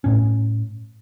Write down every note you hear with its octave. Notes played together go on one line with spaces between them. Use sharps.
A2 C#4